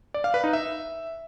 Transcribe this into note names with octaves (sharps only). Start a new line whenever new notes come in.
D5
F5
B4
D#4
E5